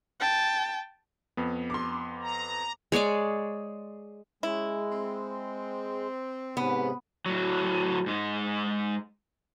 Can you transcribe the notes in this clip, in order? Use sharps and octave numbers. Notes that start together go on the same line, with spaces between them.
G5 A5
F2 B3
C6 D6
A#5
G#3 C#5 D5 D6
G#3 C#4 E4
C4
G#2 C3 B3 C#4 B4
A2 F#3
G#2 G#3